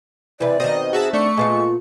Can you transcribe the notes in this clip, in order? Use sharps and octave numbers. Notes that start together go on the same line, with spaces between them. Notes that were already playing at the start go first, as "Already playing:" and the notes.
C3 E3 B4 D5
B2 D#3 C4 D#5
F#4 G#4 E5 A5
A3 D4 C#6 C#7
A#2 G#3 B3 F4